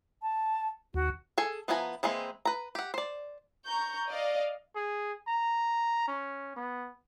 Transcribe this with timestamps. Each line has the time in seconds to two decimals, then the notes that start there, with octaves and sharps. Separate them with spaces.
0.22 A5
0.94 D#2 F#4
1.38 G#4 A4 G#5
1.68 F3 B3 E4 G#5 A#5
2.03 E3 G#3 A#3 C4
2.45 B4 A#5
2.75 G4 F#5
2.94 C5 D5
3.66 A#5 C#6 G6
4.09 D5 D#5 F5
4.75 G#4
5.27 A#5
6.08 C#4
6.56 B3